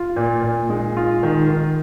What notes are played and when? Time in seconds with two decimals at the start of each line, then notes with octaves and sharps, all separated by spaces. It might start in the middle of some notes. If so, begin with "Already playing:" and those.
Already playing: F4
0.16 A#2
0.42 A#2
0.70 G#3
0.97 F4
1.23 D#3
1.49 D#3